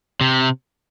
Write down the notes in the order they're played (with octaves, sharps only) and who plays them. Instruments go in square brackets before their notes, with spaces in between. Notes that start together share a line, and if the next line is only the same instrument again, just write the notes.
[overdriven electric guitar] C3